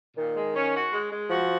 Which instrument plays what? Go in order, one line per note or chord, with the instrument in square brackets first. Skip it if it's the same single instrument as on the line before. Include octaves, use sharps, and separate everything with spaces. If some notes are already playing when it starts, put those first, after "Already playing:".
[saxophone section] A#2 [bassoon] D#3
[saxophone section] G#3
C#4
F#4
G#3
G#3
[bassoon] F3 [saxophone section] F#4